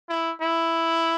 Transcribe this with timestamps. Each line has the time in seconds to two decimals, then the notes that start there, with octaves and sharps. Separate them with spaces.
0.09 E4
0.42 E4